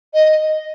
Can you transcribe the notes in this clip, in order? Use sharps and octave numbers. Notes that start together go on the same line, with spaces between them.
D#5